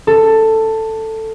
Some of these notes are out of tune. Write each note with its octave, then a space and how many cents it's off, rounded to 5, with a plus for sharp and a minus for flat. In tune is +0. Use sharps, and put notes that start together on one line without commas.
A4 +10